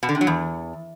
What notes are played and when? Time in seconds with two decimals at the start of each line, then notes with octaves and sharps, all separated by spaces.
0.03 B2
0.09 D3
0.15 C3
0.21 F#3
0.27 E2